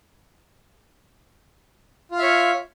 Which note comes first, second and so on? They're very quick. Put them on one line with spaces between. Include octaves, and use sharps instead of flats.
F4 F5 E5 C#5